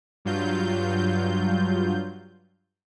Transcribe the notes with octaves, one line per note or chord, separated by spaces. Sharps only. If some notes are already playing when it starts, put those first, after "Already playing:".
G2 F#3 F4 G6